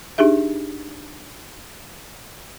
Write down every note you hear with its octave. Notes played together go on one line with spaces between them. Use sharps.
D4 D#4 G4 G#4 E5